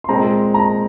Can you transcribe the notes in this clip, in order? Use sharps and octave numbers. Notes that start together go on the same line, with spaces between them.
C6
A#2 G#3 C4 A#5
A#5